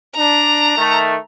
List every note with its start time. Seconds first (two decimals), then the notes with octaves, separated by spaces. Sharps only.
0.16 D4 A#5
0.77 D#3 A3